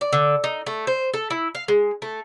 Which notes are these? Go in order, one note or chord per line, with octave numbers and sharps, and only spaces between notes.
D5
D3
D#4
A3
C5
A4
E4
F5
G#3
A3